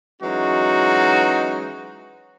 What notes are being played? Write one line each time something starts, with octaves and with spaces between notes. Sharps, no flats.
E3 F#3 G#3 C#4 D#4 F#4